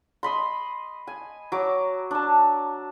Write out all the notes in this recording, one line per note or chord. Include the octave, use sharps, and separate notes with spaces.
D#5 B5 C6
G#5
F#3 D6
D4 A5